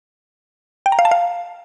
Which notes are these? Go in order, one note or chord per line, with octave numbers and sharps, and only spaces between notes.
G5
A#5
F5
A5
F5